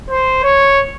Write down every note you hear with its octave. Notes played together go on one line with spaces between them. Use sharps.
C5
C#5